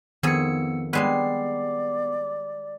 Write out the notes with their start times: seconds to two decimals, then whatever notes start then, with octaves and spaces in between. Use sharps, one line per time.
0.23 F2 D#3 B3 G#4 E6 C#7
0.93 G3 G#3 B3 B4 D5 C7